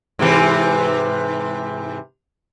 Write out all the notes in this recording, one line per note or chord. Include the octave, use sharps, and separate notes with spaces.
G#2 C3 E3